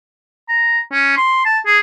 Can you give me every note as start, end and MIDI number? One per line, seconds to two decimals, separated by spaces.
0.49 0.79 82
0.92 1.12 61
1.17 1.40 84
1.45 1.59 81
1.66 1.79 68